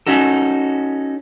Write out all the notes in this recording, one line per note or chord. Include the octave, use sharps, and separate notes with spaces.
C#4 D#4 F#4 A4